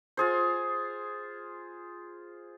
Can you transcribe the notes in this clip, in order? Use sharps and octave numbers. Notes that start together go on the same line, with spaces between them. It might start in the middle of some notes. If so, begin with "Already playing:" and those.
F4 G#4 C5